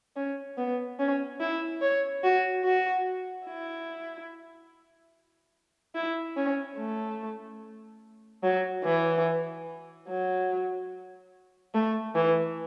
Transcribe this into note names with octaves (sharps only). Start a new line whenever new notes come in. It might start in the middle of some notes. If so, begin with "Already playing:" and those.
C#4
B3
C#4
E4
C#5
F#4
F#4
E4
E4
C#4
A3
F#3
E3
F#3
A3
E3